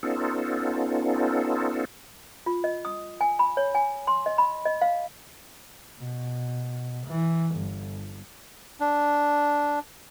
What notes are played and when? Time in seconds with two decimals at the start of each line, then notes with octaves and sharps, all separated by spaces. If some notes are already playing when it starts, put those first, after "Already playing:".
0.03 B3 C#4 D#4 F4 A4
2.46 F4
2.64 D#5
2.85 D#6
3.21 G#5
3.39 B5
3.57 C#5
3.75 G#5
4.07 C6
4.26 D#5
4.38 B5
4.65 D#5
4.82 F5
5.99 B2
7.07 E3
7.56 G1
8.80 D4